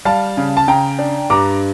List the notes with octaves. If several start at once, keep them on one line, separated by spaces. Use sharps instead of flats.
G3 F5 A5
C#3
A5
C#3 G5 A#5
D4
G2 A#5 D6